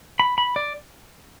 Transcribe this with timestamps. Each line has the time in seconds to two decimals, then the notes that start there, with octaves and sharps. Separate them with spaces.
0.19 B5
0.38 B5
0.56 D5